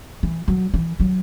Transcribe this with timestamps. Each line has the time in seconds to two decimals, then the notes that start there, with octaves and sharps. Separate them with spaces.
0.23 E3
0.48 F#3
0.74 E3
1.00 F#3